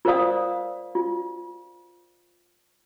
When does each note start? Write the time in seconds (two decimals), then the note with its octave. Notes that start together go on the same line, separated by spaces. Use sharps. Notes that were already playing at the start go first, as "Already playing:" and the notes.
0.05 F4 A#4 C5 D5 F5 D#6
0.95 F4